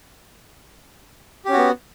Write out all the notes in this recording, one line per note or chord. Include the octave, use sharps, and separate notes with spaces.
B3 C#4 F#4 G4